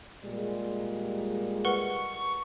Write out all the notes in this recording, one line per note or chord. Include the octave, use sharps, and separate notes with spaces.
A#2 G3 G#3
A#4 B4 F#5 C#6